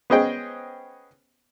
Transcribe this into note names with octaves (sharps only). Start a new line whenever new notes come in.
B3 C#4 G#4 C5 D#5 G5